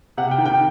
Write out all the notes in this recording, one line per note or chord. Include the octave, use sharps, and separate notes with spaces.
C3 F#5
G5
D#3
G5